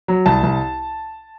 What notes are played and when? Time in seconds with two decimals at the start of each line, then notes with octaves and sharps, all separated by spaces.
0.08 F#3
0.26 C2 A5
0.43 C2